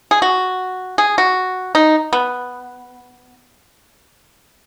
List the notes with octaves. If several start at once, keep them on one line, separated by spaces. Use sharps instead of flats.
G#4
F#4
G#4
F#4
D#4
B3